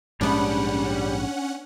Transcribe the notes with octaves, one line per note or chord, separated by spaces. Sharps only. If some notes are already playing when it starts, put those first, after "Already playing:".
A#1 G#2 G3 G#3 B3 C#4 D4 F#5